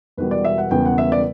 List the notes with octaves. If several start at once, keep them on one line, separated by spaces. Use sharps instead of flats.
E1 E2 B2 G3 B4
D5
E5
F#5
E1 E2 C#3 G3 B3 G5
F#5
E5
D5